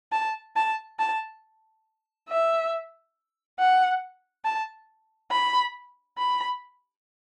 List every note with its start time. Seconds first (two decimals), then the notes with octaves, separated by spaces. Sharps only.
0.12 A5
0.56 A5
0.99 A5
2.29 E5
3.59 F#5
4.45 A5
5.31 B5
6.18 B5